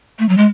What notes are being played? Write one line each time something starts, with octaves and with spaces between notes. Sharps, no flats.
A3
F#3
G#3